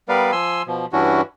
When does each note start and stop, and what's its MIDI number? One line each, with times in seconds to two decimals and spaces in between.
0.09 0.32 55
0.09 0.32 59
0.09 0.32 70
0.09 0.32 71
0.09 0.32 74
0.09 0.32 77
0.32 0.62 53
0.32 0.62 80
0.32 0.62 84
0.32 0.62 88
0.67 0.86 47
0.67 0.86 53
0.93 1.21 43
0.93 1.21 52
0.93 1.21 61
0.93 1.21 62
0.93 1.21 64
0.93 1.21 66